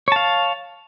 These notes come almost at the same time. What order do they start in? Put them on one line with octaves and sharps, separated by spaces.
C#5 A5 F5